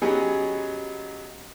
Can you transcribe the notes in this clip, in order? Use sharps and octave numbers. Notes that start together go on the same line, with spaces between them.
F#3 B3 C#4 D#4 G4 G#4